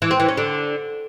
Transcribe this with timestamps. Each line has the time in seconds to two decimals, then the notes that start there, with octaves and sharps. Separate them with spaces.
0.02 E3
0.11 C4
0.20 E3
0.29 C#4
0.37 D3